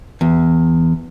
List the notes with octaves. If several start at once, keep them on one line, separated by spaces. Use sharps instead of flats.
E2